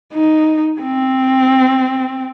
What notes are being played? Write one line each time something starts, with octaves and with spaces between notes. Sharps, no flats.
D#4
C4